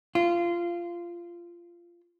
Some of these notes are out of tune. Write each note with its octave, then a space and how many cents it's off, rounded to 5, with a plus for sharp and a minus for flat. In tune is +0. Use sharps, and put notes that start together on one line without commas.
F4 -15